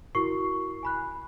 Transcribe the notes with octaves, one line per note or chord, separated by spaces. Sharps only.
E4 F#4 A#4 C#6 C7
G#5 B5 F#6